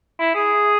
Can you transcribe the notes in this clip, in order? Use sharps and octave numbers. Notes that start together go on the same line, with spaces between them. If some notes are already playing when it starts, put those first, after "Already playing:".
E4
G#4